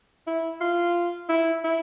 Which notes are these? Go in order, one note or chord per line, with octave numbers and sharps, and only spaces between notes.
E4
F4
E4
E4